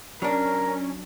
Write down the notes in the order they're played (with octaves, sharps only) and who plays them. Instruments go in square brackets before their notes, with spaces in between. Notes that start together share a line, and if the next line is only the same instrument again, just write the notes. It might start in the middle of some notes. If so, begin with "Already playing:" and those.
[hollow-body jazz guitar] F#3 D4 [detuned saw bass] C#4 [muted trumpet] A#4